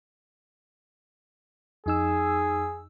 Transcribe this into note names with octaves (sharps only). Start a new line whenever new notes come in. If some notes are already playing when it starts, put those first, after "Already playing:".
F2 D#4 G#4 E6